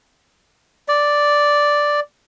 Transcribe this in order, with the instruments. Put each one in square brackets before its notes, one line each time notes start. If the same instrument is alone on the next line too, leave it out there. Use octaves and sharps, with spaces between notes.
[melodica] D5